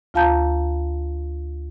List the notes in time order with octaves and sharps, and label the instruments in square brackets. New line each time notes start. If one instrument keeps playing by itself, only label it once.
[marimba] D2 F4 F5 A5 A#5 G6